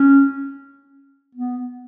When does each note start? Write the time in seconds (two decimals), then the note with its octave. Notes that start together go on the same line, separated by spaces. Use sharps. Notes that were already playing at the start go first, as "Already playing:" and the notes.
Already playing: C#4
1.35 B3